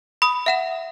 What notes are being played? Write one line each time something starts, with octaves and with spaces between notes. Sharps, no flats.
B5 D#6
E5 F#5 E7